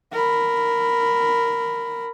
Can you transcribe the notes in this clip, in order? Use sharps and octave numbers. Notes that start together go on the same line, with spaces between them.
A#4 B5